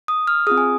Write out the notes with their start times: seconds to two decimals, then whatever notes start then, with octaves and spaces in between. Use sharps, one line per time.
0.08 D#6
0.27 F6
0.47 C4 F4 G#4 D#6
0.58 G#5